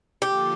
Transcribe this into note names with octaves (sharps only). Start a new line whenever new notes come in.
D3 F3 A#3 F4 G4 A4